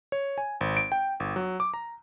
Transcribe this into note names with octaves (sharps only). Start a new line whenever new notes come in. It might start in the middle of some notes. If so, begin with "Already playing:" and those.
C#5
G#5
G#1
D7
G5
G1
F#3
D6
A#5